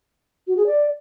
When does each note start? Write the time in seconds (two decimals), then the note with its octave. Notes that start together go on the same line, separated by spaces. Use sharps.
0.47 F#4
0.57 G#4
0.66 D5